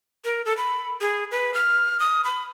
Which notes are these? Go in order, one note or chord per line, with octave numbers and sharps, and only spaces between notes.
A#4
A4
B5
G#4
B4
F6
D#6
B5